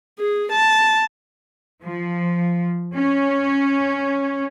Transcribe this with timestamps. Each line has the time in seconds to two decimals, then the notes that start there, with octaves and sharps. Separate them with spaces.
0.20 G#4
0.52 A5
1.85 F3
2.96 C#4